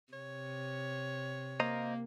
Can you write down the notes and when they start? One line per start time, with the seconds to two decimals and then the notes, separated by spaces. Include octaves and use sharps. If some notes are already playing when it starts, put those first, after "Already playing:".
0.13 C3 C#5
1.60 A#3 C5 D#5 A#5